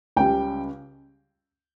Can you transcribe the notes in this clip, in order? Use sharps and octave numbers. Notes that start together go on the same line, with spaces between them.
C#2 C#3 G3 G5